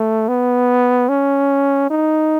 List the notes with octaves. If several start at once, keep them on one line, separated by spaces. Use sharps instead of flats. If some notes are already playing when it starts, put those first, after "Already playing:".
Already playing: A3
B3
C#4
D#4